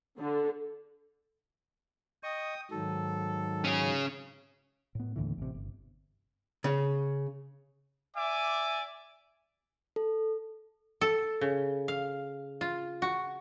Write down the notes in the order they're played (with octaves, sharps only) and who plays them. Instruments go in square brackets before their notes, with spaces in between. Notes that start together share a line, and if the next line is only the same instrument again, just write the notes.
[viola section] D3
[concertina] D#5 C#6 [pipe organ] G5 D#6
[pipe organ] G#2 D#3 F#3 [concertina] A4
[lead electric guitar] C#4 G#4
[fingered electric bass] A2 B3
D#2 A2 D3 E3
A1 C3
G1
[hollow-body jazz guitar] C#3
[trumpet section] D5 E5 G#5 D6
[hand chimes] A4
[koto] A4
C#3
F5
F4
F#4